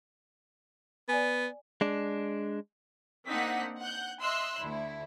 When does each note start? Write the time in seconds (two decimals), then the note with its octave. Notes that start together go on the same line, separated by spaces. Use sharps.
1.09 B3 D5 G#5
1.81 G#3 D4
3.27 A#3 C4 D4 D#4 F#5 B6
3.79 F#5 F#6 G6
4.20 D#5 E5 C6 E6 F#6
4.61 D2 E4